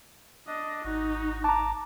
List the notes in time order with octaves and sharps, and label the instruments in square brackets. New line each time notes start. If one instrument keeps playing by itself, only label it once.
[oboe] D4 [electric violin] D#5
[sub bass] G#1 [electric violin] D#4 [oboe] F#4
[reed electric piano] A5 A#5 [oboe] D6